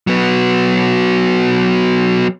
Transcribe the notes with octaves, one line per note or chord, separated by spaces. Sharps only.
F#3 B3